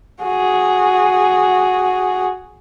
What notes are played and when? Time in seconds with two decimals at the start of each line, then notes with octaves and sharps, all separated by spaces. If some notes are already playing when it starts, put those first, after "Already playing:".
0.23 F#4 G#4